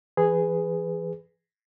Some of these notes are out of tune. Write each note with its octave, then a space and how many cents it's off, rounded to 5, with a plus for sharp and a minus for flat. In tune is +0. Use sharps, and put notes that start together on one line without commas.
E3 +30 G#4 -5 B4 +15